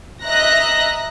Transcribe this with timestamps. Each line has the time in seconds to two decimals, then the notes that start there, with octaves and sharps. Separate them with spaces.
0.25 D#5 E5 A#5 F#6 A#6